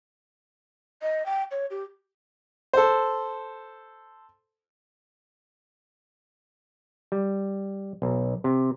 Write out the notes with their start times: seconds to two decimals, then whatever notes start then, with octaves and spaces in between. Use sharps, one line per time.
1.02 D#5
1.26 G5
1.51 C#5
1.70 G4
2.73 A4 C5
7.12 G3
8.02 B1
8.44 C3